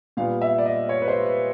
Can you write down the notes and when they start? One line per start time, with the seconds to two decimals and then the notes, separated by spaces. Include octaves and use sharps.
0.17 A#2 G3 B3 F5
0.41 E5
0.58 D5
0.66 D#5
0.89 C#5
1.02 B4
1.08 C5
1.26 B4